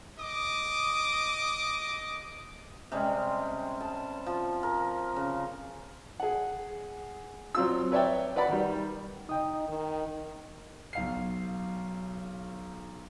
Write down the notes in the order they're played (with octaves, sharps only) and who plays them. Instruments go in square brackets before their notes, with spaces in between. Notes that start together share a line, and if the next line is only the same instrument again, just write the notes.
[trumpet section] D#5 D6 D#6
[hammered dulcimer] C3 G3 G#3 C#4
A5
F3
A#4
C#3
[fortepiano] G#4 F#5
F#3 C4 F4 E6
B4 C#5 D5 E5 G5
B4 D5 F#5 B5
D#3 G3
[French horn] D#4 [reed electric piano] D#5 G5 D#6
[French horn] D#3
[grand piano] B1 F5 C7